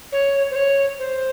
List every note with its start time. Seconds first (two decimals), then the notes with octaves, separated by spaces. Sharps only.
0.12 C#5
0.51 C5
0.56 C#5
0.99 C5